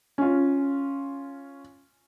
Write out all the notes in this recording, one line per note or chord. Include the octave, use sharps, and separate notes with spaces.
C#4 F4